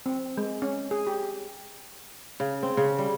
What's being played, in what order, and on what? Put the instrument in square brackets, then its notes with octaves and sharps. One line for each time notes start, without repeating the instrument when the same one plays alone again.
[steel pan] C4
G#3
C#4
G#4
G4
[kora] C#3
C4
C#3
G3